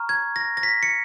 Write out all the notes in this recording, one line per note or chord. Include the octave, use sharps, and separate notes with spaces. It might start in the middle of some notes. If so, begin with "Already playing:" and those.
Already playing: A#5 C#6 F6
G#6
A#6
A#6
B6
C#7